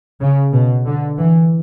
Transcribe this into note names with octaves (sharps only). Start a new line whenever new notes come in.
C#3
B2
D3
E3